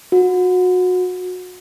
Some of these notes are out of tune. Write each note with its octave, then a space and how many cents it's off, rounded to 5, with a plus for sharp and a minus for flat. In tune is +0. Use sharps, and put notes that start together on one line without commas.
F#4 -25